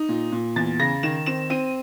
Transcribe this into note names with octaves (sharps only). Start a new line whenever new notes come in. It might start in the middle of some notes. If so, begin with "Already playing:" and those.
Already playing: D#4
A#2
A#2
E2 A6
C#3 A#6
D#3 E7
C4 E7
C4 D#7